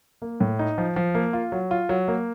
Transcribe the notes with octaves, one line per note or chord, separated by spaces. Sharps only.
A#3
A2
D#4
F3
F3
A#3
F4
F#3
F4
F#3
A#3